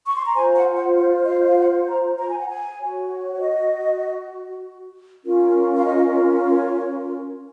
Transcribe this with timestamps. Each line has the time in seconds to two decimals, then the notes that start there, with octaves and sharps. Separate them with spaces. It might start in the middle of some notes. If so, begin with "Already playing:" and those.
0.07 C#6
0.15 C6
0.25 A#5
0.35 F4 C5 G#5
0.55 F#5
0.76 F#5
0.97 F5
1.23 D#5
1.26 F5
1.46 F5
1.57 F#5
1.88 A#5
2.18 A#5
2.29 G#5
2.38 F#5
2.49 G#5
2.79 F#4 C#5
3.34 C#5
3.40 D#5
5.24 C#4 F4 A#4
5.78 F5
5.84 D#5
6.46 C#5